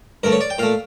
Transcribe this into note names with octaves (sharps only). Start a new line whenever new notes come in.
G2 D3 A3 A#4
C#5
D5
G5
A#2 A3 F5